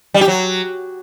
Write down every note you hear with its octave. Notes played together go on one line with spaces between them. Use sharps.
G3
G4
F#3